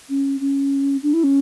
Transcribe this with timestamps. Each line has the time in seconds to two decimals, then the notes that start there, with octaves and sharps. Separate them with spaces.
0.09 C#4
0.40 C#4
1.03 D4
1.13 E4
1.24 C#4